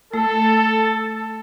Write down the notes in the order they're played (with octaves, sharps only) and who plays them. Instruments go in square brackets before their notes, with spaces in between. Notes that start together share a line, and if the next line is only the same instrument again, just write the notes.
[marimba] A3 [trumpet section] A4